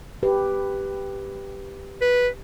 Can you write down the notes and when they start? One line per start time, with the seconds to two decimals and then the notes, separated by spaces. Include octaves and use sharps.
0.23 G4 B4
2.01 B4